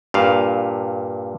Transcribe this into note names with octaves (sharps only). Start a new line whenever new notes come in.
G2 A#2 F5